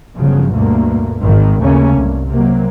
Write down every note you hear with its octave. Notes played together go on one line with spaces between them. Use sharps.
G1 C#3 F3 F#3
D2 G2 B2 A3 A#3
G#1 G#2 D#3
D#2 C#3 A3 A#3 C#4
C2 G2
C3 F#3 A#3